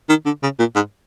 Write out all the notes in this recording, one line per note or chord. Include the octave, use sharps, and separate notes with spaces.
D#3
D3
C#3
A#2
G#2